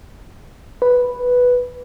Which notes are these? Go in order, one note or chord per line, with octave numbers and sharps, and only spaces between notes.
B4